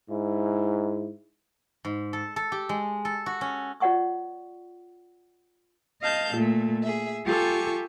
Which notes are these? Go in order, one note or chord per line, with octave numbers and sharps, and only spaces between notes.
G#2 E4
G#2
A4
A4
G4
G#3
A4
F#4
C#4
F4 C#5 D5 F#5 C#6 D#6
D#5 F5 A5 G6
A#2 A3
G#4 E5
F4 G4 A4 G#5 C#6